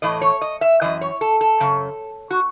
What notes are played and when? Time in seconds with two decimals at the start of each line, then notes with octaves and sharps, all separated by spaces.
0.02 A2 E3 D#5
0.21 C#5
0.41 D#5
0.61 E5
0.81 F#2 E3 D#5
1.01 C#5
1.21 A4
1.41 A4
1.60 F#2 C#3
2.31 F#4